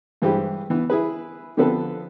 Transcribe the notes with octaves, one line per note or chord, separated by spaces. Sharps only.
G2 E3 G#3 G4 B4 C5
E3 B3
E4 G#4 B4
D3 F3 B3 C4 A4 B4